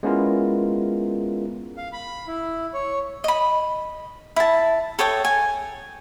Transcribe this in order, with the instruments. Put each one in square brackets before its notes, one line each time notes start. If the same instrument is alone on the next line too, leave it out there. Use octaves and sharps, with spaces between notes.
[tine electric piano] G#3 B3 C#4 E4 F4 A#4
[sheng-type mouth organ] F5
B5
E4
C#5
[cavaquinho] D#5 B5
E4 A5
A4 C#5 G5 D#6
G#5